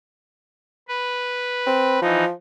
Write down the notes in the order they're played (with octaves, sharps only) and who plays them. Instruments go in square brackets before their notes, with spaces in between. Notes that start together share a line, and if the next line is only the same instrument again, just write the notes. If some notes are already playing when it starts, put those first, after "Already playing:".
[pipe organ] B4
[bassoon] C4
[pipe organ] E3 D#4 [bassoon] F3